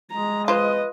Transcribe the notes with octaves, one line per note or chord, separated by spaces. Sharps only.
G#3 A#5
F4 B4 C5 D#5